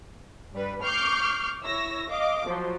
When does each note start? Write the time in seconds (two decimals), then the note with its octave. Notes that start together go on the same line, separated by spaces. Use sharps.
0.53 G2 G3 B4
0.83 C#6 D6 F6 G6 C7
1.62 E4 C#5 E6 A#6
2.09 D#5 F5 D6
2.45 F3 F#3